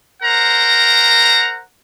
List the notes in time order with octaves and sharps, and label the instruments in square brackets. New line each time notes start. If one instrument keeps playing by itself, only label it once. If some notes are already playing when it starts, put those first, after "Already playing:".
[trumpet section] A#4 C5 F#5 A#5